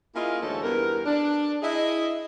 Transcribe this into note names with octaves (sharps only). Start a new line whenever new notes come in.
A#3 C#4 E4 F4 G#4 D#5
D2 G#2 E3 C#4 A4
E2 G2 B3 A#4
D4
E4 G#4 D#5